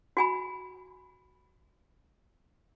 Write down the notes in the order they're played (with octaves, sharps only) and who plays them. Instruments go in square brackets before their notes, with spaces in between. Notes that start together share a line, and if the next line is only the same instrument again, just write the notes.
[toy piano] F#4 G#5 B5